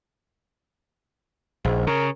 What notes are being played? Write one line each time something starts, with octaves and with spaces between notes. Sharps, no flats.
A#1 G#2
C#3 A#4